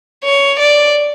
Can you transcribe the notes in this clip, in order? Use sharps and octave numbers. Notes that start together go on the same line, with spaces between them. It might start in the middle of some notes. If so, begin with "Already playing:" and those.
C#5
D5